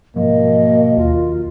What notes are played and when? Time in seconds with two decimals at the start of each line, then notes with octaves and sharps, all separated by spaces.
0.16 G#2 B2 F3 F#3 A#3 D#5
0.97 D#2 F4